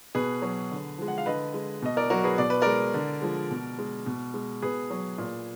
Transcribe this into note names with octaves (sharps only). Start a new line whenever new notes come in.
B2 G#4 B4
F#3
D3
F3 G#3
F#5
F5
D3 B4 D#5
G#3
B2 D#5
A#4 D5
F#3 F#4 A#4
G#4 B4
B2 D5
B4
G#3 A#4 D5
D3
F3 G#3
B2
G#3
B2
G#3
B2 G#4 B4
F#3
A#2